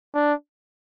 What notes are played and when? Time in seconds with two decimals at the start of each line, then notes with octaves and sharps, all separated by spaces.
0.15 D4